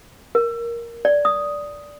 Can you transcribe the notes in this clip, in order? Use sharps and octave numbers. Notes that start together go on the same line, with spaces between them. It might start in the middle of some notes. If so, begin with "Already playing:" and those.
A#4
D5
D#6